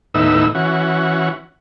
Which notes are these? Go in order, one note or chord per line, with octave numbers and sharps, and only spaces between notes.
D#2 A2 B3 D#4 E4 E6
E3 C#4 F#4